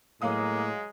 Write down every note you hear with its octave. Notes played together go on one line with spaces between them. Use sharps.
A2 F#3 G#3 A#3 F5 D#6